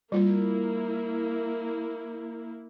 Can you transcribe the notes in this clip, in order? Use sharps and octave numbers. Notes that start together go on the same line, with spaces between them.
G3 A#3 E4 F4